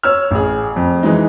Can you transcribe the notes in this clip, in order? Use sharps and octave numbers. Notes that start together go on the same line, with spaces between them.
C#5 E6 F6
A1 G#4
F2
E3 G#3 D#4